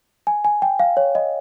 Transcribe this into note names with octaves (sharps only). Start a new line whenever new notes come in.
G#5
G#5
G5
F5
C#5
D#5